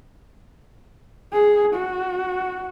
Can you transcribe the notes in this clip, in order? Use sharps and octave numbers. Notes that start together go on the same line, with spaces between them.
G#4
F#4